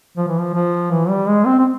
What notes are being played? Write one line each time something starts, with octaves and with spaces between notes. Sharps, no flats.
F3
E3
F3
F3
E3
G3
G#3
C4
C4